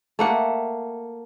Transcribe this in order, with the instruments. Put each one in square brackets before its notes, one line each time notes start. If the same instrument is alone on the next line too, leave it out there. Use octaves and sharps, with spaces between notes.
[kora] A3 A#3 F#5